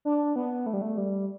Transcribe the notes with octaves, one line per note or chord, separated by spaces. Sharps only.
D4
B3
A3
G3
A3
G3